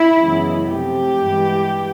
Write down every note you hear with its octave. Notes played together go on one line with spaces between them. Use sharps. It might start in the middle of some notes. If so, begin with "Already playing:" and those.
Already playing: E4
F#2 C#3 E3 G#3 B3
C3 F3 A3 G4
G2 E3 G#3 B3